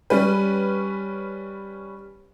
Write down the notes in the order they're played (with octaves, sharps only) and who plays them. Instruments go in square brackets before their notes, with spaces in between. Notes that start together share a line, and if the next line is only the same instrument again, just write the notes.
[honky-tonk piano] G3 C#4 B4